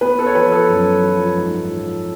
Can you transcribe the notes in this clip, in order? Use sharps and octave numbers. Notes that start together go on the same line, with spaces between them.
B3 B4
A4
C#5
F3 B4
A4
F#2
F3
G#2
F3